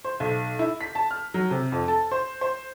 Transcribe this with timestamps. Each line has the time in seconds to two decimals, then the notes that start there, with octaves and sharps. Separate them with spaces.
0.04 C5
0.20 B1
0.59 E4
0.81 B6
0.95 A5
1.11 F6
1.34 F#3
1.51 C3
1.72 F2
1.88 A4
2.11 C5
2.41 C5